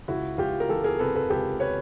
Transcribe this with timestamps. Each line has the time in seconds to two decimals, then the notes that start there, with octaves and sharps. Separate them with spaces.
0.08 C#2 E4 F#4
0.38 C#2 F4 G4
0.60 A#4
0.69 E3 G4 A4
0.84 G#4 A#4
0.99 C3 A4 B4
1.15 A4 B4
1.30 C#2 G4 A4
1.60 B4 C#5